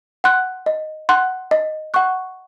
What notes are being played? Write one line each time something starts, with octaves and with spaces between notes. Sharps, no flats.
F#5 C6 F#6
D#5
F#5 C6 F#6
D#5
F#5 C#6 F#6